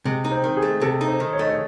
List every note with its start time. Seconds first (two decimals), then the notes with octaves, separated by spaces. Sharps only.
0.05 C3 G#3
0.25 D#4
0.31 C4
0.44 D#3
0.57 G#4
0.62 A3
0.81 C3 A4
1.01 D#4
1.08 C5
1.20 D#3
1.33 C#5
1.39 A3 D#5
1.49 C#5